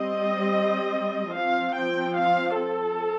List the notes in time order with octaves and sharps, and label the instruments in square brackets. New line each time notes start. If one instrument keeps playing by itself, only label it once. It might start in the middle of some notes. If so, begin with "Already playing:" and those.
Already playing: [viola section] G3 C4 D#5
F3 C4 F5
G5
F5
A4